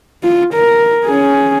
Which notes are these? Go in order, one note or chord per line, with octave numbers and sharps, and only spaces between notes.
F4
A#4
C#4 G#4